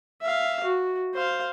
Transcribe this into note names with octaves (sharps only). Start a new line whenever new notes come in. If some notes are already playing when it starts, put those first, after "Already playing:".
E5 F5
F#4
C5 F5